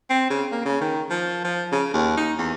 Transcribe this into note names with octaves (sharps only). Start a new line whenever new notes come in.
C4
C#3
A#3
C#3
D#3
F3
F3
C#3
D#2
D#4
E2